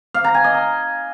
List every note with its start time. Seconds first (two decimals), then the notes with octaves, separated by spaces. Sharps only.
0.14 F5
0.24 A#5
0.34 G#5
0.44 D#5
0.54 A#5